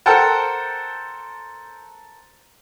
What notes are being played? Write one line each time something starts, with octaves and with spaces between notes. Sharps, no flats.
A4 A#4 C5 F#5 G5 A5